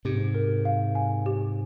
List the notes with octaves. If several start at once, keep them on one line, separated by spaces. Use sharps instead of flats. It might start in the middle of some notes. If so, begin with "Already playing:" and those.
G#2 C3 G4
A#4
F5
G#5
G4